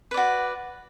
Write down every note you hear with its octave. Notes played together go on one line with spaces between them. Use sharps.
F#4 B4 D5